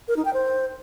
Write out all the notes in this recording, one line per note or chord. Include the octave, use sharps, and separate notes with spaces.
A#4
D#4
G5
C5